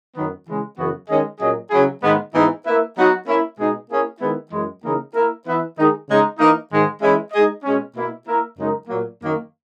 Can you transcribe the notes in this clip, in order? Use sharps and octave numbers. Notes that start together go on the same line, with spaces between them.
F#2 D#3 F#3 B3
C#3 E3 G#3
F#2 C#3 E3 B3 F#4
D#3 G#3 C#4 G#4 D#5
A#2 F#3 C#4 G#4 D#5
C#3 F#3 C#4 E4 G#4
G#2 D#3 G#3 B3
G#2 E3 B3 D#4
A#3 E4 B4 E5
F#3 B3 D#4 F#4
A#3 C#4 E4
B2 G#3 D#4 G#4
A#3 C#4 E4 G#4
D#3 G#3 B3 E4
F#2 E3 G#3
C#3 E3 A#3 D#4 A#4
A#3 E4 A#4
E3 B3 E4 B4 E5
D#3 G#3 D#4 G#4
C#3 G#3 D#4
E3 A#3 D#4
G#2 D#3 G#3
E3 G#3 C#4 E4
G#3 D#4 G#4 D#5
B2 G#3 C#4
B2 A#3 E4
A#3 E4 A#4 E5
F#2 C#3 G#3 D#4 A#4
A#2 F#3 A#3
F#2 D#3 A#3